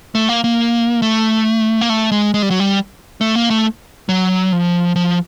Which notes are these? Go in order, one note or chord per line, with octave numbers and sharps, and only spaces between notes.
A3
A#3
A#3
A3
A#3
A3
G#3
G#3
G3
F#3
G3
A3
A#3
A3
F#3
F3
F3